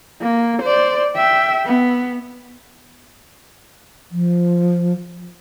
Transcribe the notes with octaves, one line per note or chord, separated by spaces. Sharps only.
A#3
C5 D5
E5 G5
B3
F3